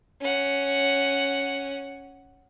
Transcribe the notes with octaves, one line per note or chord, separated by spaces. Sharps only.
C#4 F#5